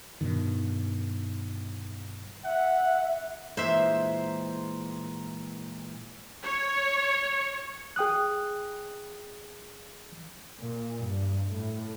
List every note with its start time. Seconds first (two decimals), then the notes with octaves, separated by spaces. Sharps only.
0.21 G2 B2 D#3
2.45 E5 F#5
3.57 A#2 E3 G#3 C5 E5
6.42 C#5
7.96 G#4 G5 D#6 F#6
10.60 A#2
11.04 G2
11.51 A2